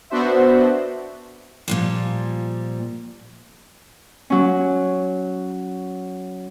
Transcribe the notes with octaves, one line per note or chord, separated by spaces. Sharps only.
B3 D4 F#4 C5 E5
A#2 F3 G3
F#3 C#4